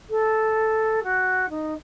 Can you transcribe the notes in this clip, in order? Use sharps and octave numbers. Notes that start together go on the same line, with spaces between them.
A4
F#4
D#4